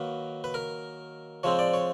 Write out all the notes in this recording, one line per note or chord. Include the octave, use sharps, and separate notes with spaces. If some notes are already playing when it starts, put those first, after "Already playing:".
Already playing: D#3 F#3 A#3 B4
B4
A#4
F3 G#3 C4 C#5
D5
C#5